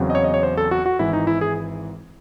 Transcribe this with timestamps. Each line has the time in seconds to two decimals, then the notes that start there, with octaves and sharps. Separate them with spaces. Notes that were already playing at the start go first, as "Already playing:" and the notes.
Already playing: E2 C#3 F#3 C4
0.10 D#5
0.15 C#5
0.24 D#5
0.34 C#5
0.43 C5
0.57 A4
0.71 F#4
0.86 F#4
0.99 G#1 G#2 E3 E4
1.13 D#4
1.27 E4
1.41 G#4